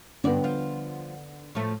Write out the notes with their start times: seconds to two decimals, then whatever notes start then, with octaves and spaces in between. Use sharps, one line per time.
0.24 G2 D3 B3 D5
0.44 F3 F4
1.55 A2 F3 A3